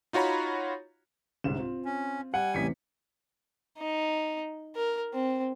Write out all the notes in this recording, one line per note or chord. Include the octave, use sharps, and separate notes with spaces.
D#4 F4 F#4 C#5 A#5 B5
G1 C2 G#2 E7
C4 F4
C#4
G3 F#5 G#5
A1 E2 C3 B6 C#7
D#4
A#4
C4